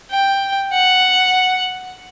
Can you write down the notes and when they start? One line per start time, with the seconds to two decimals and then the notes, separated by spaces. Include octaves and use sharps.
0.11 G5
0.73 F#5